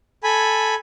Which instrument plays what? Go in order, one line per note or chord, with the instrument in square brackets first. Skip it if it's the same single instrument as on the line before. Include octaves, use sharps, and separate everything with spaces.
[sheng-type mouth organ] A4 G#5 B5